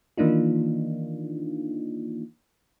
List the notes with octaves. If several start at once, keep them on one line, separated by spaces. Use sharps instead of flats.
D#3 E3 A#3 D4 D#4 F4